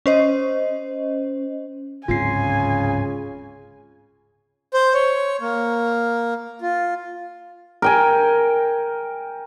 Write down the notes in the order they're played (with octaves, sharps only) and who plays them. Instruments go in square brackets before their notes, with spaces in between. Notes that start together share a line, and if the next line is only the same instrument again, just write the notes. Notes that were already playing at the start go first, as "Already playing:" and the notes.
[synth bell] C#4 C5 D#5
[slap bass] D1 G#2 C4 [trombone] C#3 [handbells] F4 C7 [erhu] G#5
[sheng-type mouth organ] C5
C#5
A#3
F4
[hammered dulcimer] A#4 G5 G#5